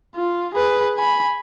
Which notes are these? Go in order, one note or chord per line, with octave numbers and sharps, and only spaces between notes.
F4
G#4 B4
G#5 B5